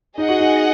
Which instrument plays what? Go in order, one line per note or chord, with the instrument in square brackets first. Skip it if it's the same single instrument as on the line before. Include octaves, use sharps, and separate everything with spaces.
[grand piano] D#4 [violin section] G#4 D#5 F#5
[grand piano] F#4
D#4